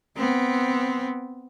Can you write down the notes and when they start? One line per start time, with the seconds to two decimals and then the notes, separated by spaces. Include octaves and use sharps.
0.17 B3 C4